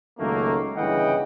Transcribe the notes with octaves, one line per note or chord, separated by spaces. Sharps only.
C#2 F#2 D#3 A3 A#3
G1 C#3 E3 D#5 F#5 G5